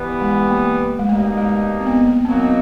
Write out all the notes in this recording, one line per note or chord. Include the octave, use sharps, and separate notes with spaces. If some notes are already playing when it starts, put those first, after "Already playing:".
Already playing: E3 G3 B3
G#3
A#3
G#3
B2 G3 A3 A#3 D#4
G#3
C4
B3
A#3
B2 F#3 A#3 C4 D#4 F#4
B3
C4